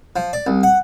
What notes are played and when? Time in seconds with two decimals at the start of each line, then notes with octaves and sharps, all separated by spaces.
0.16 F3
0.33 D5
0.47 C2
0.63 F#5